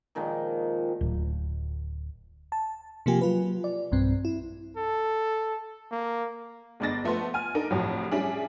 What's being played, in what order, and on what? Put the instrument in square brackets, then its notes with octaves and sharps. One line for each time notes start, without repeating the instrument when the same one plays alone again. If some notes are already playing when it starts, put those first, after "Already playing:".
[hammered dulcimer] A#2 D#3 F3 G#3
[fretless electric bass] D1
[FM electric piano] A5
C3 F3 A#3 F4 G4 G#5
F#3 F4 B4
D5
B1 G2 C4
E4
[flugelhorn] A4
A#3
[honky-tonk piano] G1 G#3 D4 D#5 A6 A#6
F3 A3 B3 C6
G#5 F6
D4 D#4 A4 A#4
C2 F2 A2 F#3
G3 C#4 D4 E4 G#4